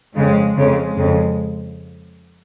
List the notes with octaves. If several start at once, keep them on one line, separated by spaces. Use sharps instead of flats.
F2 C#3 G#3
F2 C#3 G#3
F2 C#3